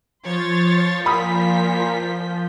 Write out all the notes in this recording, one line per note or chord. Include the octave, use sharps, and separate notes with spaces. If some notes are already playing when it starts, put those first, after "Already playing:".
F3 C#5 C6 G6 A6
A#2 F4 B5 D#6 B6